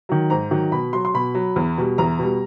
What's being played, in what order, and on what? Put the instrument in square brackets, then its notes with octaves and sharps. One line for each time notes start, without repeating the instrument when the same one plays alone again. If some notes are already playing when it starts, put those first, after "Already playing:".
[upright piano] D#3 F#3
G#2 A#5
D#3 F#3
B2 B5
F#3 C6
C6
B2 B5
F#3
E2
B2 G3
E2 A#5
B2 G3